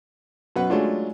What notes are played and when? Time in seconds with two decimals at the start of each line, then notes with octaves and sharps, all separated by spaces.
0.56 F#2 B2 B3 B4 F#5
0.70 F#3 G#3 A3 C#4 D4 F4